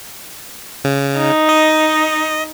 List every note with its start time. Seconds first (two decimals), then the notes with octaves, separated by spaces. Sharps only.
0.84 C#3
1.17 D#4
1.49 D#5